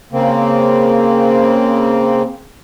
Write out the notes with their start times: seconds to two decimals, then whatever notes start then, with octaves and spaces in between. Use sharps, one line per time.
0.12 C#3 A#3 C4